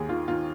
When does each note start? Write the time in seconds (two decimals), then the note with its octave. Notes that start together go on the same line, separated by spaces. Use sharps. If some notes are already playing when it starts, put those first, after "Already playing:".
Already playing: D#2 G#4
0.09 D#3 F4
0.28 D#3 F4